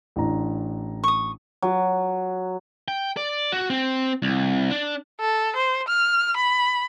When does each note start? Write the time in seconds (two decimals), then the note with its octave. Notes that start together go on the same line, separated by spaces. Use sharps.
0.16 A1 D4 A#5
1.04 C#6 D#6
1.62 F#3
2.88 G5
3.17 D5
3.52 F#4
3.70 C4
4.22 C2
4.71 D4
5.20 A4
5.56 C5
5.88 F6
6.36 B5